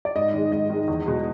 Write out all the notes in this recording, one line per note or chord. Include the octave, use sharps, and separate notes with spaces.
D5
G#2 D#5
D#3 G#3
G#2 D#5
D#3 G#3
E2
B2 G#3